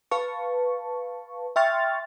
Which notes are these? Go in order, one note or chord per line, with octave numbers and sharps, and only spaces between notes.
B4 F5 A5 C#6
E5 G5 C6 C#6 F6 A6